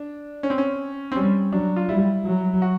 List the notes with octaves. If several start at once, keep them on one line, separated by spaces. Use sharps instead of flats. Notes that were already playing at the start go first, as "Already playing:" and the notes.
Already playing: D4
C#4
C4
C#4
C4
G3 C#4
F#3 D4
F4
G3 E4
F#3
F#4